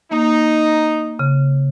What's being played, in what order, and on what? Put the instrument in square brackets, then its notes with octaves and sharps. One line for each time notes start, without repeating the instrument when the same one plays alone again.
[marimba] A#3 [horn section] D#4
[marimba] C#3